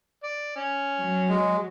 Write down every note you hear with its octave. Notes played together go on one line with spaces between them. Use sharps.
D5
C#4
F#3
G#3